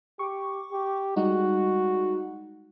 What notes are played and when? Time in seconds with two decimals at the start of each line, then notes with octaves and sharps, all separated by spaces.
0.19 G4 C#6 D6
0.72 G4
1.16 G3 G#3 D#4 F#4